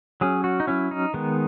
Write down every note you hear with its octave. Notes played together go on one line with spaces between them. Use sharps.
F#3 C#4 G#4
F#4
D#4
F#3 C#4 E4
D#4
D#3 G#3 B3